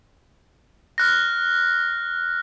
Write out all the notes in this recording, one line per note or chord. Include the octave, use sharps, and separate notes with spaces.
F6 F#6 A#6